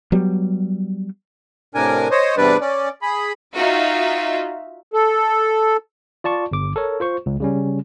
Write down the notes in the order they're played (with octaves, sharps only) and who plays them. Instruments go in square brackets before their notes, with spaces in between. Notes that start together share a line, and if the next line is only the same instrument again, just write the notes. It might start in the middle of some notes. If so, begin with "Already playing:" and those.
[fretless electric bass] F#3 G3 B3
[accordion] A2 C3 D4 A#4 G#5
C5 C#5 D#5
E2 C3 G3 D4 B4 D5
C#4 D5
G#4 B5
[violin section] D#4 F4 F#4 E5
[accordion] A4
[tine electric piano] F4 D5 A5 C#6
G1 D6
A4 A#4 C#5
F4 C5 C#6
C#2
C#3 G3 C#4